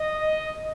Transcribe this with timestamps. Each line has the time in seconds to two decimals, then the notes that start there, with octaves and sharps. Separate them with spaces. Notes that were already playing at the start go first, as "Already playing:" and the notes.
Already playing: D#5